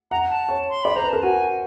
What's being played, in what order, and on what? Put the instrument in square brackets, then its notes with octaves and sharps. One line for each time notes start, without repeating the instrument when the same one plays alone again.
[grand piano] F#5 [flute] A#5
[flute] A5
[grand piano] C#5
[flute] C6
[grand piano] D5 [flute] B5
[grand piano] C5 [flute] A#5
[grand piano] B4
[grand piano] A#4 [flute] A5
[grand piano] F#4 [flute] G#5